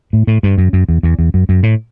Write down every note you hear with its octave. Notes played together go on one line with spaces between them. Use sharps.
A2
A2
G2
F#2
F#2
E2
E2
E2
F#2
F#2
A2